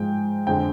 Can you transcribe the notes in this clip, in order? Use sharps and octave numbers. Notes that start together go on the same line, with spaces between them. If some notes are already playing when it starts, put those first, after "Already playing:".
Already playing: G#2 F3 G#3 G5
F2 D3 G#3 G5